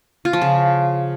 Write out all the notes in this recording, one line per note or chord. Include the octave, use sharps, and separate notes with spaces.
F4
F3
C#3